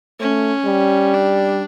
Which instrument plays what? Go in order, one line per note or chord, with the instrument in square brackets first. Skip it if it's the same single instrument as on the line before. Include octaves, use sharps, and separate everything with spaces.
[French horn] A3 [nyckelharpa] C#4
[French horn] G3
[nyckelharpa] D4